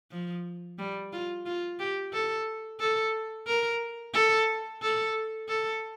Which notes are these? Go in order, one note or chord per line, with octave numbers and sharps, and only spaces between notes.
F3
G3
F4
F4
G4
A4
A4
A#4
A4
A4
A4